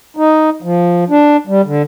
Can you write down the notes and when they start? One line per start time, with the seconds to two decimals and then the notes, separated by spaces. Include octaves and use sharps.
0.17 D#4
0.62 F3
1.10 D4
1.47 G3
1.65 D3